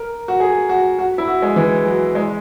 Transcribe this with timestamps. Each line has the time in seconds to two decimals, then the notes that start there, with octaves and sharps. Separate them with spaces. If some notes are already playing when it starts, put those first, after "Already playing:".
Already playing: A#4
0.28 F#4
0.40 G#4
0.69 F#4
0.99 F#4
1.18 E4
1.28 F#4
1.42 G#3
1.56 E3
1.86 F#3
2.15 G#3